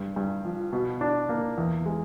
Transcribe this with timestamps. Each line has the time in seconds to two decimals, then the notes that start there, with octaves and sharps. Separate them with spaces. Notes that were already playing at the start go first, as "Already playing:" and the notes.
Already playing: G2
0.16 G2
0.45 F3
0.73 B2
1.01 D4
1.29 A#3
1.58 E2
1.86 G#3